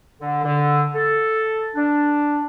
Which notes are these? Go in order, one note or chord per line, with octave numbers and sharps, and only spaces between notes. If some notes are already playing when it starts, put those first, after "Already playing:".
D3
D3
A4
D4